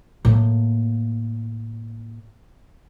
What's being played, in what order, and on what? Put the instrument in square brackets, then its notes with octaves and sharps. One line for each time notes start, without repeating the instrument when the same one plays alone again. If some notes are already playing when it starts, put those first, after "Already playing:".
[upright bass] A2 A#3